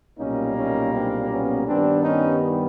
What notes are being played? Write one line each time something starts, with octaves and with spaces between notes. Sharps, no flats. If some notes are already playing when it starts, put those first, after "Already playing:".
B1 A#2 G3 A#3 C#4 D#4
C#4 D#4
C4 D4
B3 C#4
G2 D#3 G3 B3 C4 D4
C#4 D#4